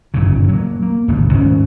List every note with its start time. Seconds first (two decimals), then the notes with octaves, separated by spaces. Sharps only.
0.14 G1 F#2 A#2 C#3
0.49 F#3 A#3
0.83 A#3
1.08 G#1 C#2 A2 D3
1.33 D#1 G#2 C#4